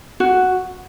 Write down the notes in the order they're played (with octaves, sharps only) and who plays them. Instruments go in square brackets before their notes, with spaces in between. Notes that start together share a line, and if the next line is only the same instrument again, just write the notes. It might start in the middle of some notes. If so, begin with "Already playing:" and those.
[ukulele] F#4